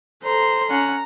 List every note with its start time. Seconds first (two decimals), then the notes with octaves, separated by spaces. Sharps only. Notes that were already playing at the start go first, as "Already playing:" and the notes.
0.24 A4 C5 A#5 C6
0.70 C#4 F#5 A#5